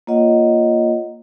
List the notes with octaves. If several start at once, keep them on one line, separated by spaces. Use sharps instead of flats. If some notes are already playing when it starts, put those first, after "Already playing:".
A#3 F4 C#5 D#5 F#5